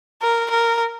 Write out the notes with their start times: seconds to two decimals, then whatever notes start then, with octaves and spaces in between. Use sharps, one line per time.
0.22 A#4
0.50 A#4